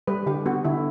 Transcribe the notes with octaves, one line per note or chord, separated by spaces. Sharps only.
G3 B4
D3 G4
B3 F#4
D3 E4